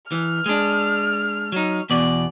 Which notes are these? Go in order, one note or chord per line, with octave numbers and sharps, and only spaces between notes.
E3 F6
G#3 D4
F#3 D#4
E2 B2 D5